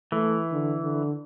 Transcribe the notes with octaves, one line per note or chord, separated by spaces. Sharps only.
E3 A3
D3
D3